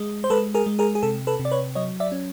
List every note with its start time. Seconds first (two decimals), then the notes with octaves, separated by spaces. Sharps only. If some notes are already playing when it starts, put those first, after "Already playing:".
Already playing: G#3
0.24 C5
0.30 G#3 A4 B4
0.54 G#4 A#4
0.66 G#3
0.79 G#4 A#4
0.95 G#4
1.03 C3 A4
1.27 A4 B4
1.40 C3
1.45 D5
1.51 B4 C#5
1.75 F#3 C#5 D#5
2.00 D5 E5
2.12 C#4